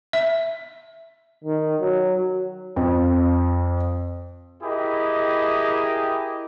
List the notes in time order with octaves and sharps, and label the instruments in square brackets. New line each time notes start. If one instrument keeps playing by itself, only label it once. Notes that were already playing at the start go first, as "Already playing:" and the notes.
[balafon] E5
[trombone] D#3
F#3
[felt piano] F2
[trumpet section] E4 G4 G#4 A#4 D#5